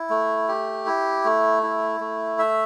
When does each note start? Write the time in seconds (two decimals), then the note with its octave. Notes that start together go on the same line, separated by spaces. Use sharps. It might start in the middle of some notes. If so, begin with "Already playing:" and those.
Already playing: E4
0.10 A3
0.49 G4
0.86 E4
1.24 A3
1.63 E4
2.00 A3
2.39 E5